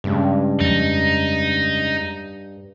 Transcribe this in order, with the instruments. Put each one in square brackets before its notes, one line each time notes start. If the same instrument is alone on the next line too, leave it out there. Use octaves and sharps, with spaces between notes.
[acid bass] G2 [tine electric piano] C#3 G#3 C#4
[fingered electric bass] F2 [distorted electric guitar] D#4